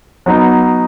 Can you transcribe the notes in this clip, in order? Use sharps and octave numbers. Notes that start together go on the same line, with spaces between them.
F#3 B3 D#4